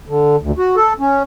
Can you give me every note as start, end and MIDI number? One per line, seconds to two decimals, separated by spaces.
0.08 0.36 50
0.42 0.51 38
0.58 0.76 66
0.76 0.93 69
1.00 1.23 61